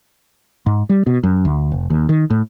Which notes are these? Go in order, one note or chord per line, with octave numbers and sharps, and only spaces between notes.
G#2
G3
B2
F#2
D2
F1
D#2
D#3
A2